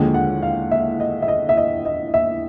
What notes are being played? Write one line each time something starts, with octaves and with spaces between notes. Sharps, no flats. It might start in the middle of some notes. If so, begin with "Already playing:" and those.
Already playing: D#2 D3 F3 G#3 G5
F#5
F5
E5
D#5
E5
D#5
E5
D#5
D#5
E5